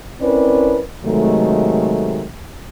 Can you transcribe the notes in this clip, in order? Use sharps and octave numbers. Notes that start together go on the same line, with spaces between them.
C4 C#4 E4 A#4 B4 D5
C3 D#3 F#3 G#3 A3